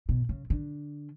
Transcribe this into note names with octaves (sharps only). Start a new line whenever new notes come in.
B2
C#3
D3